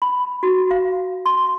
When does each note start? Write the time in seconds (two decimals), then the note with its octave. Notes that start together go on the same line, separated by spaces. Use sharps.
0.02 B5
0.43 F#4
0.71 F5
1.26 C6